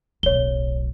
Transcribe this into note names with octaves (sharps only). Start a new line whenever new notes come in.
D1 B1 C#5 G7